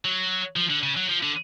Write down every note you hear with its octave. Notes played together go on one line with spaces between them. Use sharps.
F#3
F3
D3
C#3
F#3
F3
D3